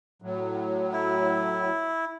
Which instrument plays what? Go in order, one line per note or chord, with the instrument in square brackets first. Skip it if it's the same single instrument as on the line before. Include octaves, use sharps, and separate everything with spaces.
[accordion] A2 F#3
[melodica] E4